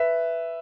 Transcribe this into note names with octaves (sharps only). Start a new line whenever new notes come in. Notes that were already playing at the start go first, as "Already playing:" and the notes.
Already playing: B4 E5